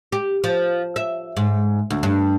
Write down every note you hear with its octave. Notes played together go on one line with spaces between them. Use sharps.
G4
F3
E5
G#2
D2
G2